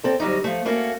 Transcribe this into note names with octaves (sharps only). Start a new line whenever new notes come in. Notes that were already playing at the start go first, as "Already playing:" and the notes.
C4 A4 D5
D2 F#3 G3 D#4
F3 A3
A3 A#3 C#4 F#4